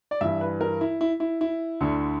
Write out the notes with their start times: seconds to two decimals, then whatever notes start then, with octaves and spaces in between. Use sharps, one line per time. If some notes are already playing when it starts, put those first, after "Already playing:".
0.11 D5
0.21 G2 E3 E5
0.41 B4
0.61 A#4
0.81 E4
1.01 E4
1.20 E4
1.41 E4
1.81 D2 D3